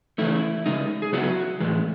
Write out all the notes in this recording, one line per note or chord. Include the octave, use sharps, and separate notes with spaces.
C#3 E3 A3 E4
C#3 G#3 D#4
G#4
C#3 F#3 B3 E4 F#4
A2 E3 G#3